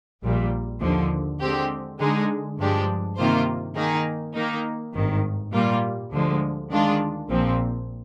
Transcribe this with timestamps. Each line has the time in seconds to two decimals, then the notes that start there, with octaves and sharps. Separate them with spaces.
0.22 A#1 A#2 G3
0.81 D#2 D3 F3
1.40 D3 G#3 C4 G4
1.99 D3 G#3 D#4 G#4
2.58 G2 F3 G#3 D4 G4
3.17 C3 D#3 A#3 F4 C5
3.76 D#3 A#3 D#4 G#4
4.35 D#3 A#3 D#4
4.94 G#1 G2 D#3
5.53 A#2 G3 A#3 F4
6.11 D2 D3 F3 G#3
6.71 D#3 G#3 D4 F4
7.29 A#1 A#2 F3 C4